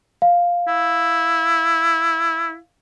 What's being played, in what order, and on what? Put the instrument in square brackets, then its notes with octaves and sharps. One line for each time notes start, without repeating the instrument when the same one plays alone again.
[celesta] F5
[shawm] E4